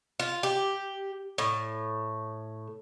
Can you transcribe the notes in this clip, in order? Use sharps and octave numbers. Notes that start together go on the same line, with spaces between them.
F4
G4
A2